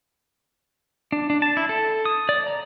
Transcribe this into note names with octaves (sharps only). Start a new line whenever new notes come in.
D4
D4
A5
E4
A4
D#6
D5
A#5